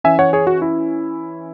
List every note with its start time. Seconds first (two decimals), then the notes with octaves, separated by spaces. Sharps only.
0.04 E3 C#4 E5 G#5
0.19 C#5 F#5
0.33 G#4 C#5
0.47 F#4
0.62 E4